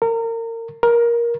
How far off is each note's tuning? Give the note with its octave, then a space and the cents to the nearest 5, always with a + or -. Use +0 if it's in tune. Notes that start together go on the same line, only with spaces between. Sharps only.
A#4 -30
A#4 +15